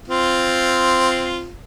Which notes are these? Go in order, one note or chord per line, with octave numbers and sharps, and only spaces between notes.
C4 F4